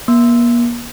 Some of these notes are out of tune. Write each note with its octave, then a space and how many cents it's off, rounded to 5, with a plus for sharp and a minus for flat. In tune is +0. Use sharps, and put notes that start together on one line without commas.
A#3 +40